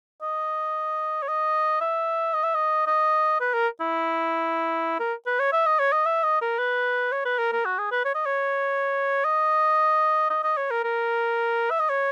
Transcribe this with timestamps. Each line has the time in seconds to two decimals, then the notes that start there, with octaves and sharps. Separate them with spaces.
0.22 D#5
1.22 C#5
1.28 D#5
1.81 E5
2.34 D#5
2.44 E5
2.54 D#5
2.87 D#5
3.40 B4
3.54 A#4
3.80 E4
5.00 A#4
5.26 B4
5.40 C#5
5.52 E5
5.66 D#5
5.79 C#5
5.92 D#5
6.06 E5
6.24 D#5
6.41 A#4
6.58 B4
7.12 C#5
7.25 B4
7.38 A#4
7.52 A#4
7.65 F#4
7.78 G#4
7.91 B4
8.05 C#5
8.15 D#5
8.26 C#5
9.24 D#5
10.30 D#5
10.44 D#5
10.57 C#5
10.71 A#4
10.84 A#4
11.70 E5
11.80 D#5
11.89 C#5